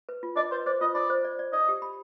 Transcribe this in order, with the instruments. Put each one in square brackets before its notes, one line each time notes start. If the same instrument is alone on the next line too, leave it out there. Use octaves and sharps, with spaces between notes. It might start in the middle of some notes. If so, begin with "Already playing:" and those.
[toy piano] B4
F4
[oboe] D5 [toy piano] D#5
[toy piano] B4 [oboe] C5
[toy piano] C5 [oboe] D5
[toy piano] F4 [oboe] D#5
[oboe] D5 [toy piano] B5
[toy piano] C5
D5
D5
[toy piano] D5 [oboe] D#5
[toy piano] G4
B5